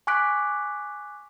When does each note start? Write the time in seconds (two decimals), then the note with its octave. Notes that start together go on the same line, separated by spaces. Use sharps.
0.07 G#5 C#6 D6 F#6 B6 D7